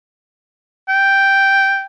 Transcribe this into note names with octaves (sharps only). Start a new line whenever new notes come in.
G5